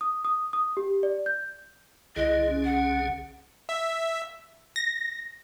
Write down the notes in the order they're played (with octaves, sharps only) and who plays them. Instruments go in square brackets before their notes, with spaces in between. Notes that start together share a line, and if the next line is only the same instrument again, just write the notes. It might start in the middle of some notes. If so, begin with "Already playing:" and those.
[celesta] D#6
D#6
D#6
G4
D5
G6
[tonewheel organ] C2 D3 G#4 [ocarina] E4 [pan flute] D#5
[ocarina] C#4
[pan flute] F#5
[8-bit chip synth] E5
[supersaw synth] A#6